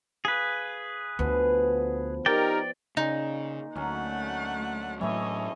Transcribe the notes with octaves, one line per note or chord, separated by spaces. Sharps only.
G#4 B4 F5
D2 F3 B3
D#4 G4 A#4 D5 G5
A#2 C#3 D#4
D2 F#3 A3 C#4 F#5
A2 E3 F#3 A3 C#4 C#5 D#5